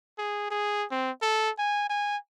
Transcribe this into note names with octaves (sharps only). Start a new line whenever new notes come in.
G#4
G#4
C4
A4
G#5
G#5